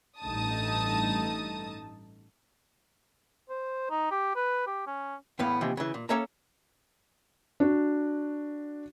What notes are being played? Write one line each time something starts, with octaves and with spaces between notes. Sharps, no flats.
A1 G2 A3 D#4 A5 D#6
C5
D#4
G4
B4
G4
C#4
E2 A2 B3 F5
D#2 C3 E3 F3
C#3 E3
A#2
A#3 C#4 A4 C#5 E5 A#5
D4 F#4